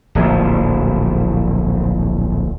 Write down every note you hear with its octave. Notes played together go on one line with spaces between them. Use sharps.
D1 A#1 F3